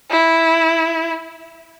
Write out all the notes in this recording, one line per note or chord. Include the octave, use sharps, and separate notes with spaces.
E4